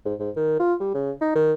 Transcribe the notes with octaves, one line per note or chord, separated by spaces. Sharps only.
G#2
G#2
D#3
F4
G3
C#3
D#4
D#3